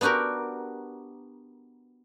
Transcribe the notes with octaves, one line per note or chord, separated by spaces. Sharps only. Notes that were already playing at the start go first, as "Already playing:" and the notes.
B3 D4 F#4 G4 A#4